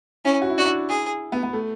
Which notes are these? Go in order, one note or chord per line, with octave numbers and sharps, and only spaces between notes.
C#4 E4
F#4
E4
D4 F#4
E4
G#4
B3
B3
A3